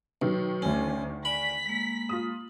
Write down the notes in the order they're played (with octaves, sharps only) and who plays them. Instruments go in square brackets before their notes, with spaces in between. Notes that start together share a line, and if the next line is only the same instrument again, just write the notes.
[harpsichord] B1 [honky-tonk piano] D#3
[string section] D2 [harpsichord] C#4
[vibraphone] D5 G#5 [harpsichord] B5 [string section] B6
[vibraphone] G#3 A#3
[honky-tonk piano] F4 D#6